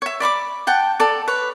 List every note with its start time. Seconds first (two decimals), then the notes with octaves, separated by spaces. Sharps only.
0.02 C#5 E5
0.20 D5 B5 C#6 D6
0.67 F#5 G5 A5
1.00 A4 D5
1.28 B4 C#5